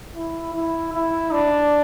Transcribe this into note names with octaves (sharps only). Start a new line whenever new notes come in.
E4
E4
E4
D4